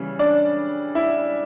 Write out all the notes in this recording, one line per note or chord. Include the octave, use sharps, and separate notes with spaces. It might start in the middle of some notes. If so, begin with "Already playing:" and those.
Already playing: C#3 E3 G3
D4 D5
E4 E5